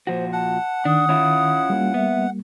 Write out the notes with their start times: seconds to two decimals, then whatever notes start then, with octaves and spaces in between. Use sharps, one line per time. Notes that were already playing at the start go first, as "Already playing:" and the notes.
0.07 A#2 F3 F#4 C5
0.32 F#5 A5
0.85 D#3 D4 D#6
1.09 C#4 E4 F4
1.70 G3 A#3
1.94 B3 E5